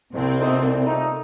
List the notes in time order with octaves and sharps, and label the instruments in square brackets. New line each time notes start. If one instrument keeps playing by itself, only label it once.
[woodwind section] C2 [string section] C3 C4
[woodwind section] A#2 A3 D#4
C2
A#2 A3 D#4